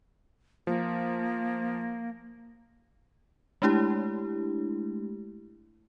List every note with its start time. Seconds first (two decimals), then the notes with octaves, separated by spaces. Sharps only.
0.67 F3 A#3
3.62 G#3 A3 D4 E4 G4